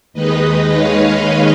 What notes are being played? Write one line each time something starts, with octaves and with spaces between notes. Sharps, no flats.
D#2 D#3 G#3 D#4 B4 D#5
C#5 F5